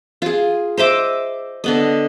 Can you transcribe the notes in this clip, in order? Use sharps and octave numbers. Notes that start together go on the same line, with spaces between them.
F4 G#4
C5 D#5 E5 D6
D3 B3 D#5